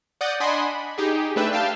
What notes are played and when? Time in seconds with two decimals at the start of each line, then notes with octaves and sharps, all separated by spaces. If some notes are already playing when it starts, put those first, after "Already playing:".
0.21 D5 F#5 D#6 G6 A6 A#6
0.40 D4 D#5 F#5 G#5 B5 C6
0.66 B5
0.98 D#4 G4 G#4
1.36 A3 D4 B4 E5 G5
1.52 G4 F5 G5 A5